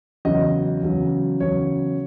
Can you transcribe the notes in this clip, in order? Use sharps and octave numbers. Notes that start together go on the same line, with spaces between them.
E2 C#3 F#3 C#4 D#5
E2 C#3 F#3 C#4
E2 C#3 F#3 C#4 C#5